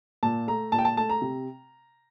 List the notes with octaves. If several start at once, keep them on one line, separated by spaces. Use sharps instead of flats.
A#2 A5
A3 A#5
A#2 A5
G5
A5
A3 A5
A#5
C3